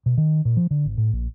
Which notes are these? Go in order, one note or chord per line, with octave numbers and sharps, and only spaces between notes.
B2
D#3
A#2
F3
D3
G#1
A2
A#1